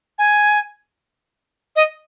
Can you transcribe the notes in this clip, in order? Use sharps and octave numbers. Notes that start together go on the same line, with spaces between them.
G#5
D#5